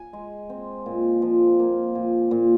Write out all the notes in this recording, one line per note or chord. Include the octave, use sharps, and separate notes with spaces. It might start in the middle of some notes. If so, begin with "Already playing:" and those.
Already playing: G#5
G#3
C4
A#2
F3
A#3
A#2
A#2